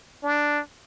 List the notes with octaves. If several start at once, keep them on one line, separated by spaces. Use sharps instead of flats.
D4